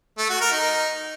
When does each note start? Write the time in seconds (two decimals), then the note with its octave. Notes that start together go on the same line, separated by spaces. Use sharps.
0.18 A3
0.29 F#4
0.41 A#4
0.52 D#4